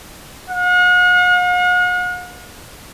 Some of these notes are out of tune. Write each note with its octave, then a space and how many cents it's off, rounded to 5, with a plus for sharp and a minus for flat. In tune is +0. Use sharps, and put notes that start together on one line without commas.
F#5 -45